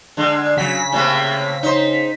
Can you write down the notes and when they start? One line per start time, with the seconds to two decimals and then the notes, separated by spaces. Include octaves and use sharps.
0.17 D3 G#3
0.57 C#3 F#3 B6
0.92 A2 C3 A#3
1.63 D#4 C5